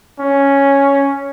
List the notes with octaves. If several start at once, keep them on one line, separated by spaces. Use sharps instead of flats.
C#4